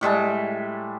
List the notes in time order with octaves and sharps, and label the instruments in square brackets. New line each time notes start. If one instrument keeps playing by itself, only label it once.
[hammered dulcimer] A2 G3 G#3 A5